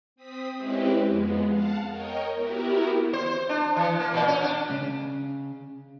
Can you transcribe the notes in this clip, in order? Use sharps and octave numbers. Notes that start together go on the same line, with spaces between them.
C4 D#6 B6
G#3 C4 C#4 E4 G4 B4
F2 G#3 B3
F5 F#5 A5
A#4 C#5 D#5 G5
B3 E4 F#4 G4 A#4
C5
C5
D4
E3
A#3
A#2
C#4
D4
C#3